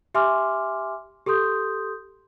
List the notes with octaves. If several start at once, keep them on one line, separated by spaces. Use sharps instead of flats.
G4 E5 G#5 C6 D6 F6
G4 A4 C6 D#6 G6